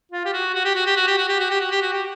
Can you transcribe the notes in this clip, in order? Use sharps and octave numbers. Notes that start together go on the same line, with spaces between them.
F4
G4
F#4
F#4
G4
F#4
G4
F#4
G4
F#4
G4
F#4
G4
F#4
G4
F#4
G4